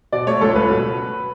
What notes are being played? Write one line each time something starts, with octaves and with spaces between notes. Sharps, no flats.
B2 D5
A3 C#5
C#2 A4
C#5
C#2 B4
B2